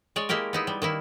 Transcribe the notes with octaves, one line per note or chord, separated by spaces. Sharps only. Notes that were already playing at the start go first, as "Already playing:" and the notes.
G#3 C#5 D5
G#3 A#3 E4 G4 A#4
B3 D#4 E4
G3
D#3 A#3 E4